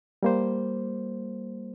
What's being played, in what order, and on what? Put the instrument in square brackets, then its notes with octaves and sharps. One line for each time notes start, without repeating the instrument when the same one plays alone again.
[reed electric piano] G3 A#3 C5